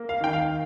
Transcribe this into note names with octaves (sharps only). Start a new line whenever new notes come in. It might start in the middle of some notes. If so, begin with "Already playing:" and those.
Already playing: A#3
F5
D#3 G5
F5